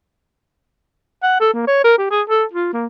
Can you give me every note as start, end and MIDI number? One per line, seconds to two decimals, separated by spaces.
1.23 1.38 78
1.40 1.51 69
1.53 1.65 58
1.67 1.80 73
1.84 1.95 70
1.98 2.06 67
2.11 2.22 68
2.29 2.44 69
2.53 2.71 65
2.73 2.86 58